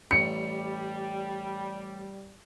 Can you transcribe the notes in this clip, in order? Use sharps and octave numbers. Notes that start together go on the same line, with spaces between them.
A1 G3 C#7